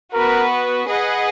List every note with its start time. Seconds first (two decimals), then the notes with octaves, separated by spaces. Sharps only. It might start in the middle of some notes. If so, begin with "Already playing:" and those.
0.13 B3 F#4 A#4 B4
0.87 G#4 B4 D#5 F#5